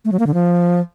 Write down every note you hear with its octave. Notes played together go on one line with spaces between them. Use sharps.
A3
F#3
A#3
D3
F3